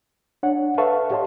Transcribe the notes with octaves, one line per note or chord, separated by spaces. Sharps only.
D4 C#5 F#5
A4 B4 E5 F5 A5 C#6
G4 C#5 D#5 A5 C6